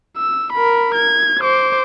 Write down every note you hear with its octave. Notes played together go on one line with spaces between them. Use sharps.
E6
A#4 B5
G#6
C5 D6